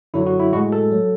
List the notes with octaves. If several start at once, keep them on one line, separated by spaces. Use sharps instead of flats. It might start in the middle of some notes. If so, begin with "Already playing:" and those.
F#2 D3 F#3 E4
F#4
E4
A2 G#3 F#4
A4
F#3